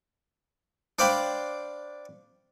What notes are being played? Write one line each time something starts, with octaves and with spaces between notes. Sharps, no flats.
D4 C5 D5 F5 G5 B5